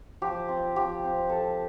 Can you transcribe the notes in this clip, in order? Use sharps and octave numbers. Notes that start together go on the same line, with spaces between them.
F3 G4
C4 F4
F3 G4
C4 F4
F3 A4